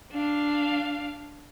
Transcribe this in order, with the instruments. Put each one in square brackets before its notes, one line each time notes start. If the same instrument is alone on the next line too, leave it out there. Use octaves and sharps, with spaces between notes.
[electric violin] D4 F5